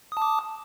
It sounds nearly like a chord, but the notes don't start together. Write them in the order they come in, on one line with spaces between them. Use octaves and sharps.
D#6 A5 D6